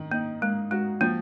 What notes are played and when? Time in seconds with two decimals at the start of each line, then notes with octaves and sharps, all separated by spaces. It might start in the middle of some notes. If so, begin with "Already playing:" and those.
Already playing: D#3
0.11 A#3 D#4
0.42 G#3 A#3
0.71 G#3 F#4
1.01 F3 A#3